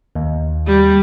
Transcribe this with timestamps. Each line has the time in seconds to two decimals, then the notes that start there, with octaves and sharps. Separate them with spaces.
0.15 D#2
0.66 G3